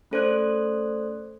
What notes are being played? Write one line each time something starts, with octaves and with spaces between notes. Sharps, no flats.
A3 C#4 A4 C5 D5 F#6